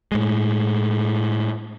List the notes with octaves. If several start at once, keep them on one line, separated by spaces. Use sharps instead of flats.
A2 G#3